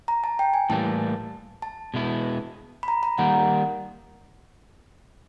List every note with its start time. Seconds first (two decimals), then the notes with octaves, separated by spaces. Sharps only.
0.08 A#5
0.24 A5
0.39 G5
0.54 G#5
0.70 A2 E3 G3 A#3 A5
1.62 A5
1.94 B2 G#3 B3 E4
2.83 B5
2.88 A#5
3.03 A#5
3.18 D#3 G3 A#3 F#5